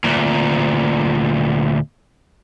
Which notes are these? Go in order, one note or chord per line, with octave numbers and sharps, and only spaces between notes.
D2 A#2